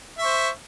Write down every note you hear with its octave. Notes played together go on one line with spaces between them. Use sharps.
C5 E5 C#6